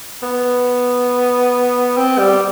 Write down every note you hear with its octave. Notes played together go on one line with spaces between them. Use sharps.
B3
C4
G3